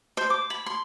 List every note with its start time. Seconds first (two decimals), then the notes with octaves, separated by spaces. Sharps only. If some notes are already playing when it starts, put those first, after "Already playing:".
0.17 C5
0.30 D6
0.50 B5
0.66 C6